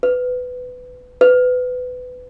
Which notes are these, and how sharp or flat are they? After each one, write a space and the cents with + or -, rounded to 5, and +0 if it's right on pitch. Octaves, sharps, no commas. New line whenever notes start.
B4 +15
B4 +20